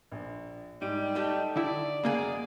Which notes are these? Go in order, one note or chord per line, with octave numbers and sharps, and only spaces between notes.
A#1
G#2 G3 D#4 D7
A3 D#4 G4 A4 D#5
D3 E4 D5
F#2 C#3 G#3 A#3 G#4 G#6